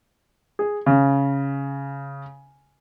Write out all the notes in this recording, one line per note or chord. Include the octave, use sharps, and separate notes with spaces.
G#4
C#3